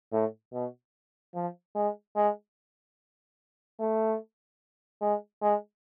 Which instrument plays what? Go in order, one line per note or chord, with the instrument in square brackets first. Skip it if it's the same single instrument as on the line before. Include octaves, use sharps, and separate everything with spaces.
[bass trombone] A2
B2
F3
G#3
G#3
A3
G#3
G#3